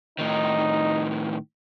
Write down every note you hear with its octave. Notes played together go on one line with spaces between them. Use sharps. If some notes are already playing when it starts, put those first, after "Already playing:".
A2 D#3 D#4